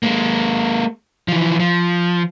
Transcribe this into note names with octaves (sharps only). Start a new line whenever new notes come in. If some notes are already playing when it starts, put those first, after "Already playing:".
G#3 A#3
E3 F3
F3